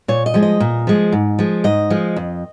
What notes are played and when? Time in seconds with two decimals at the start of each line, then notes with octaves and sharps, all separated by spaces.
0.08 A#2 C#5
0.26 D#5
0.34 F3 G#3
0.42 D#5
0.60 A#2
0.87 F3 G#3
1.12 G#2
1.39 F3 G#3
1.64 G#2 D#5
1.90 F3 G#3
2.16 F2